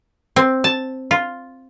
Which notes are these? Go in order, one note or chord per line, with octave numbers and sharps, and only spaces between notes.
C4
A5
F4